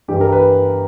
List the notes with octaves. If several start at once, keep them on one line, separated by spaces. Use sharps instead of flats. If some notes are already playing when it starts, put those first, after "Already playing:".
G2 E3 G3 G4
A#4
B4